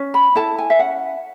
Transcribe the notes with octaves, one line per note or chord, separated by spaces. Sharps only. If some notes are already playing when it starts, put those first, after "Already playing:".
Already playing: C#4
B5
E4 A4 A5
G#5
E5
C#4 F#5